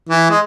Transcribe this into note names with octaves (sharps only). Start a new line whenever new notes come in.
E3
G#3